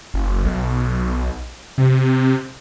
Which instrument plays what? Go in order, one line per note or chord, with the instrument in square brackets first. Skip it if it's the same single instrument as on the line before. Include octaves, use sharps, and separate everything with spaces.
[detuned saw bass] F#1
B1
C3